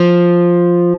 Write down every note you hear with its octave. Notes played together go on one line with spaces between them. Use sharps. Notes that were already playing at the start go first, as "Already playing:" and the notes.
Already playing: F3